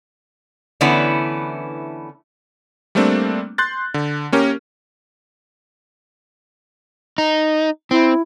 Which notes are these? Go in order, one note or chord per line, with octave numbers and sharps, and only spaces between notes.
D3 E3 A3 B3 C#4 E4
G3 A3 A#3 C4 D4
C6 F#6 G6 A6
D3
A#3 C#4 G4 A#4
D#4
C4 E4